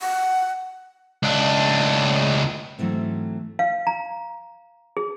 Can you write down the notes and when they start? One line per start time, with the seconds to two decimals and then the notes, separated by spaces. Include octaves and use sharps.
0.01 F#5
1.23 C#2 D4
2.79 G#2 E3 F#3 A3 C4
3.59 F5
3.87 A#5
4.97 G#4